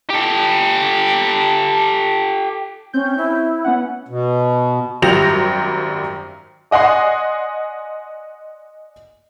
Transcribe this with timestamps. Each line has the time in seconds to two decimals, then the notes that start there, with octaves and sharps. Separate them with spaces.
0.10 G4 A4
2.93 C4 C#4 G6
3.17 E4
3.64 B3 C#4 F#5
4.08 B2
5.02 G#1 F#2 G3 G4 A#6 F7
6.71 D5 D#5 F#5 G#5 C6